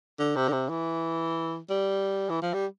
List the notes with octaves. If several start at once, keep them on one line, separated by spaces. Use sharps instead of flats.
D3
C3
D3
C3
E3
G3
E3
F3
G3